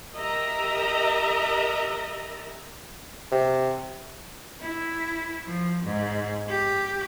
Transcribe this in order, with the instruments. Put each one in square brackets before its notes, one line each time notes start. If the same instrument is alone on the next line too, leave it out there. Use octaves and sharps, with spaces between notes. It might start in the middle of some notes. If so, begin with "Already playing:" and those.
[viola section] G4 A#4 D#5 E5 A#5
[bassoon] C3
[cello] E4
F3
G#2
G4